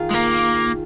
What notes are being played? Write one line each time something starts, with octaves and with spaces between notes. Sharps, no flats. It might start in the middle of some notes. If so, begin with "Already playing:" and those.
Already playing: D#3 F4 G#4
G#3
A#3